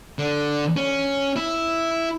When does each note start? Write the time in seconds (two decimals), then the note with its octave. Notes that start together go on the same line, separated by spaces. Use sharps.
0.19 D3
0.77 C#4
1.36 E4